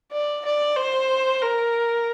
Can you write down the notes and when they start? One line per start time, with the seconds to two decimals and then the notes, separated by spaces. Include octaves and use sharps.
0.12 D5
0.45 D5
0.77 C5
1.42 A#4